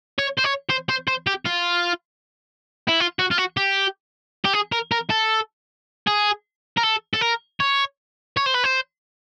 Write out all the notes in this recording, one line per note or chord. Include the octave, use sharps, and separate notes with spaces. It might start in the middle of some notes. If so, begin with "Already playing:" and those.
C#5
C5
C#5
C5
C5
C5
G4
F4
E4
F4
F#4
F4
F#4
G4
G4
G#4
A#4
A#4
A4
G#4
A#4
A4
A4
A#4
C#5
C#5
C5
B4
C5